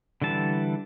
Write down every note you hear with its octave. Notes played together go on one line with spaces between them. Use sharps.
D3 E3 G3 A5